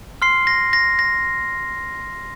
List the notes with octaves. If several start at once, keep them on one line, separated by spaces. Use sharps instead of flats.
C6 F6 C7
A#6
A#6
A#6